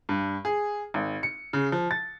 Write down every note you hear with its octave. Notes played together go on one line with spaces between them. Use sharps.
G2
G#4
G#1
C#7
C#3
F3
A6